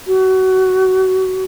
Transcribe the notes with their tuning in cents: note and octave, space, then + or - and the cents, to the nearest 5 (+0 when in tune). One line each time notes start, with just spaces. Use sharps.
F#4 +25